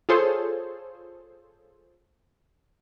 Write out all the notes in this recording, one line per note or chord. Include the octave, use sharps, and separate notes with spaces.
F4 G#4 A4 C5 C#5